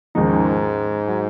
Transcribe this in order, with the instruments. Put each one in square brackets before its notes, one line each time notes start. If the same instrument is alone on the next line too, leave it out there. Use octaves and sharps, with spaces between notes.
[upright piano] D#2 C#3 F3 G#3 D#4 [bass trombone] G#2
[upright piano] F#3